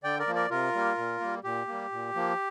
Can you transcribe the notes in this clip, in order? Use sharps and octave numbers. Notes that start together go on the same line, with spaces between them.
D3 D5 G5
A#4 D5
F3 A#3
A#4 D5
C3 F4 A#4
G3 A#3
A#2
G3 A#3
A#2 G4
G3 A#3
A#2
F3 A#3